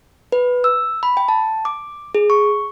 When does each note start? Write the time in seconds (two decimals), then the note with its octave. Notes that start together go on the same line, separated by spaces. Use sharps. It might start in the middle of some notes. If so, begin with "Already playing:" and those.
0.32 B4
0.64 E6
1.03 B5
1.17 G5
1.28 A5
1.65 D6
2.15 G#4
2.30 C#6